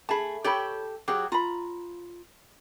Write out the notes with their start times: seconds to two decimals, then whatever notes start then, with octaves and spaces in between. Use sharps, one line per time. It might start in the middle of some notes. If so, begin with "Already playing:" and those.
0.09 A3 G#4 A5 B5
0.44 G4 A4 C#5 G5 B5
1.08 F#3 G4 G#4 F#5
1.32 F4 A#5 B5